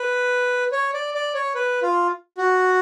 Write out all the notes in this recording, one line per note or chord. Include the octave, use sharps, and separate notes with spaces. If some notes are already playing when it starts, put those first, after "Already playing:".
Already playing: B4
C#5
D5
D5
C#5
B4
F4
F#4